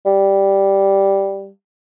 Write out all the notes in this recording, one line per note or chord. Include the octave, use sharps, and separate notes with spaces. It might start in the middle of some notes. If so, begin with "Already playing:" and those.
G3